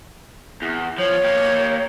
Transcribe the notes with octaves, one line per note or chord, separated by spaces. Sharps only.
E2
F3 C#5
A#3 G4